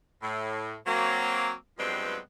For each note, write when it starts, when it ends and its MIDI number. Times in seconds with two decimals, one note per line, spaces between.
0.22 0.75 45
0.87 1.52 54
0.87 1.52 58
0.87 1.52 60
1.79 2.17 43
1.79 2.17 53
1.79 2.17 54
1.79 2.17 56
1.79 2.17 59
1.79 2.17 60